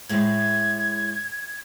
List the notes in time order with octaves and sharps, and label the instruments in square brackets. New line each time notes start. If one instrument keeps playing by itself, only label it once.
[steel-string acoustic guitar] A2 G#3 [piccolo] G#6